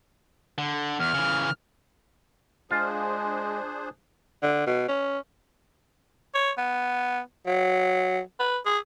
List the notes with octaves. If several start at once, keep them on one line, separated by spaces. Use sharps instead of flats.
D3
E2 F6
C#3 E3
G#3 D4 F4 G#4 C5
D3
B2
C#4
C#5
B3
F#3
B4
G#4